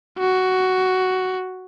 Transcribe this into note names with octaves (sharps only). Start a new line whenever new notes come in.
F#4